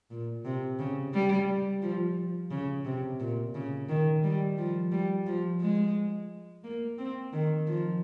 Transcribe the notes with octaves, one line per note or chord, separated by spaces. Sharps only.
A#2
C3
C#3
G3
F3
C#3
C3
A#2
C#3
D#3
G3
F3
G3
F3
G#3
A#3
C4
D#3
F3